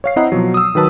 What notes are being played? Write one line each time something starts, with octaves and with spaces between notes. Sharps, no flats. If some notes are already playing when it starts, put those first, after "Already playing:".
C#5 F5 C7
C4 E4 C5 D#5 F#5 A#5
B2 F3 F#3
D#6 E6
D#3 F#3 B4 A5